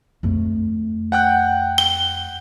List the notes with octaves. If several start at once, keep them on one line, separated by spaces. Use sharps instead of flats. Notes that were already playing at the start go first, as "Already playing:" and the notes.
F2 A3
F#5 G5 F#6
G7